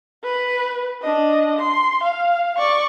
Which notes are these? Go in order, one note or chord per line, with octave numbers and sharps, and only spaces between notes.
B4
D4 D#5
C6
F5
D5 C#6